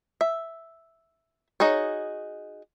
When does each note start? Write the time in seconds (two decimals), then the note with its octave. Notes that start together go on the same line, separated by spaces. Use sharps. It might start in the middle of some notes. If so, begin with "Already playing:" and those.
0.21 E5
1.60 D#4 F#4 G#4 C#5